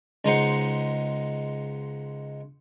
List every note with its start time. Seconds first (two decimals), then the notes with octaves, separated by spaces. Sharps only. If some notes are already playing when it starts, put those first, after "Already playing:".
0.25 C#2 G#3 D#4 C5 F#5